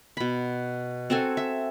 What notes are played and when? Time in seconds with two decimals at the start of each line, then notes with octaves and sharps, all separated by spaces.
0.17 B2 B5
1.10 C4 F#4 A4 G#5
1.37 E5